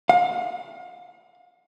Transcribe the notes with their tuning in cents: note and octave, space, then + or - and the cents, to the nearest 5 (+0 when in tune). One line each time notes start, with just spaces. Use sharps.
F5 +40